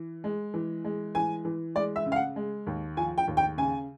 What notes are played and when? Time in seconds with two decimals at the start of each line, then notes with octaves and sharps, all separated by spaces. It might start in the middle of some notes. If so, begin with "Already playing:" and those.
Already playing: E3
0.24 G#3
0.54 E3
0.85 G#3
1.15 E3 G#5
1.45 E3
1.75 G#3 D5
1.96 E5
2.06 C#3
2.12 F5
2.16 F#5
2.36 G#3
2.67 D#2
2.97 F3 G#5
3.18 G5
3.28 D#2
3.37 G5
3.58 C#3 G#5